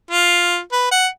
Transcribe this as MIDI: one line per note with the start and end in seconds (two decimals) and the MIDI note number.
0.11 0.60 65
0.72 0.87 71
0.91 1.07 78